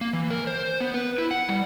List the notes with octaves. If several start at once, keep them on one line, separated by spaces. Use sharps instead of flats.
A#3
E3
A#4
C5
B3
B4
E4
F#5
G3